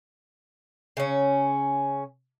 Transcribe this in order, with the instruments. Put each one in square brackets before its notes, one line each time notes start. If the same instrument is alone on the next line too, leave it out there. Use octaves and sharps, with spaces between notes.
[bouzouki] C#3 C#4